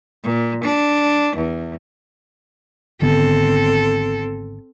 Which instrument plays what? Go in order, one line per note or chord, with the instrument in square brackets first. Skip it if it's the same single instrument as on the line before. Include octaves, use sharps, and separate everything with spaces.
[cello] A#2
D4
E2
[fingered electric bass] G#1 D3 B3 [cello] C4 A4